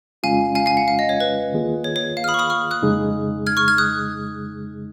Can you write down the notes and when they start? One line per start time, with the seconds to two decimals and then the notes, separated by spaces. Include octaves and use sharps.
0.23 F2 C#3 G#3 C#4 F4 F5 G#5
0.55 F5 G#5
0.66 F5 G#5
0.77 F#5
0.88 F5
0.99 D#5
1.09 C#5
1.20 B4
1.53 D#2 D#3 A#3 F4 G#4
1.84 C#5
1.96 C#5
2.17 F5
2.24 F6
2.28 B5 D#6
2.34 C#6
2.39 B5 D#6
2.50 C#6 F6
2.71 D#6 F#6
2.82 F2 C#3 G#3 D#4 G#4
3.46 F6 G#6
3.57 C#6 F6
3.68 F6 G#6
3.78 D#6 F#6